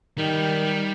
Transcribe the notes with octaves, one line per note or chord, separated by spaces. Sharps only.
D#3 G3
G3